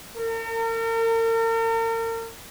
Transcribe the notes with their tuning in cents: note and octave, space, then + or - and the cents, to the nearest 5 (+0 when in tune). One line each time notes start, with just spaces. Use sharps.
A#4 -40